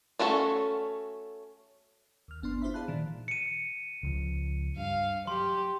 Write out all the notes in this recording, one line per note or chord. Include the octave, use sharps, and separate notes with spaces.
A3 C#4 F#4 A4
D#2 F6
G1 B3 D4 C6
E4 F4 C5 D5 E5 B5
G#4 D5 F5 A5 B5 F#6
A#2 D#3
C#7 D#7
C#2 F3
G2 F5
F#3 G4 C6